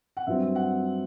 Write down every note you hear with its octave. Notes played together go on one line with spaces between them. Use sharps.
F#5
G2 F#3 C4 E5
F#5